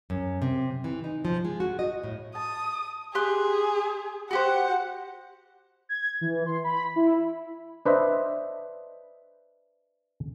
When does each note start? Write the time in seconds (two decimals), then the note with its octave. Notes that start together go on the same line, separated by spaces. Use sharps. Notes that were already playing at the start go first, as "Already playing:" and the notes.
0.10 F#2
0.42 C3
0.84 E3
1.04 D#4
1.25 F3
1.45 G#3
1.60 F#4
1.79 D#5
2.04 A2
2.35 A5 D#6
3.15 G4 G#4 C6 F#6
4.31 F#4 G4 C5 F#5
5.89 G#6
6.21 E3
6.46 C6
6.64 B5
6.96 E4
7.86 D4 B4 C5 D#5 E5